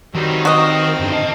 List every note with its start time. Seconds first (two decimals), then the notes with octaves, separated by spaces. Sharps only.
0.15 D#3 F#3 G3 C4
0.45 C4 F#4 A#4 D#5 F6
1.00 G2 D3
1.12 D#5 A5